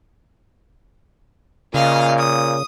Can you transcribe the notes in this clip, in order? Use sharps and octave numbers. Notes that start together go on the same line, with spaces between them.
A#2 C#3 D#5 F5
D#6